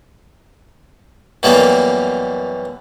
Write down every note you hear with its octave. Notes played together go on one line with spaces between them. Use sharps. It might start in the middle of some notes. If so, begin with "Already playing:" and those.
F#2 B2 E3 G3 A#3